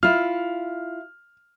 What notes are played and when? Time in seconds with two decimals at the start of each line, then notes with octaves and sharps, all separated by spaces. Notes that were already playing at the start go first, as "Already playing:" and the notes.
0.03 E4 F4 F6